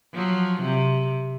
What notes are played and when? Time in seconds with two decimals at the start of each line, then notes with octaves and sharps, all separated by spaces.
0.13 F3 F#3
0.62 C3